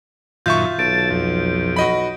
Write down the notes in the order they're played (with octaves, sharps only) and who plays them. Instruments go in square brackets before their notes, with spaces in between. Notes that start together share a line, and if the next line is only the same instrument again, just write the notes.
[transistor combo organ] F#2 A#2 D#3 [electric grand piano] F4 E5 C#6 [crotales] G6
[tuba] B1 [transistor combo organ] A4 A5 [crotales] D7
[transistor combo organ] F2
[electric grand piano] F#4 D#5 B5